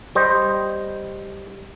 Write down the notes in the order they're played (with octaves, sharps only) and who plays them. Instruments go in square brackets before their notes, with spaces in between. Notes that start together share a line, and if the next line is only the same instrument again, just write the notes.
[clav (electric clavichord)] G3 C5 D#5